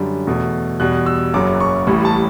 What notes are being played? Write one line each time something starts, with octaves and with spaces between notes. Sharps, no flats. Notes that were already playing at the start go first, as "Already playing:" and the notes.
Already playing: F#2 D3 G3
E2 B2 A3
E2 B2 G3 F#6
E6
F#1 F#2 C#3 F#3 D6
C#6
A1 A2 G3 C#6
A5